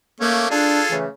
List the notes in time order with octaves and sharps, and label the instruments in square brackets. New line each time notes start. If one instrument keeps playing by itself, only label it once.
[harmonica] A3 C#4 [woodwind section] A#3
[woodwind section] D4 [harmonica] F4 G#4 A4
[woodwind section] C#3 E3 A3